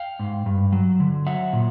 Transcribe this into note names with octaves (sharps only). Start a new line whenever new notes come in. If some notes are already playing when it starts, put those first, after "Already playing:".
Already playing: F5 G5
G#2
G2
F#3
D3
F#3 E5 F#5
A#2